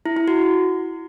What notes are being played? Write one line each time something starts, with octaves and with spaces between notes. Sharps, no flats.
E4
E4
F#4